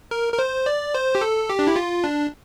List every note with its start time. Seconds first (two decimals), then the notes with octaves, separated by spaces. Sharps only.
0.11 A#4
0.33 A#4
0.39 C5
0.66 D5
0.94 C5
1.15 G4
1.21 A4
1.49 G4
1.59 D4
1.67 E4
1.76 F4
2.04 D4